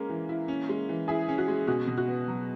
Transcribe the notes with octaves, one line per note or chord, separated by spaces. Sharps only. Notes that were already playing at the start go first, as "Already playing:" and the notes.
Already playing: G#3 A#3 C#4
E3
E4
C#4
G#3
E3
E4 G#4
C#4
F#4
G#3
B2 F#4
B2
F#4
B3
F#3